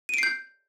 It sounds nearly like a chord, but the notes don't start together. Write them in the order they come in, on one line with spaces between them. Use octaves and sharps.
D#7 D7 C7 G6